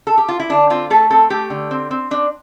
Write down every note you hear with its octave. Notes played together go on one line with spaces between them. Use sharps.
A4
G4
F4
E4
D3 D4
C4 F4
A3 A4
C4 A4
A3 G4
D3
C4
C4
C4 D4